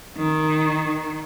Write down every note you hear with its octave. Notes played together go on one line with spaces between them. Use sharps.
D#3